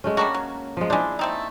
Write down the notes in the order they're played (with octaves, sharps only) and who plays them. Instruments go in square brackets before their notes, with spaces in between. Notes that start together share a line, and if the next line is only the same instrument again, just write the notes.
[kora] G#3 A3 C#4
[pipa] G3 D4 F#4 [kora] A#3
[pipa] F#3
[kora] F3 G#3
[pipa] G#3 C5 [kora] D4 E4
[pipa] A3 C4 D#4